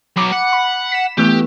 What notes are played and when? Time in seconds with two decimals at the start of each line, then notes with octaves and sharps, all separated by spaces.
0.17 F#3 B3 B5 D6
0.32 F#5
0.53 B5
0.92 B6 E7
1.18 E3 A3 B3 G4